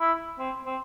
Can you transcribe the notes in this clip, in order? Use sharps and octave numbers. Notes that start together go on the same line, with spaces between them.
E4
C4
C4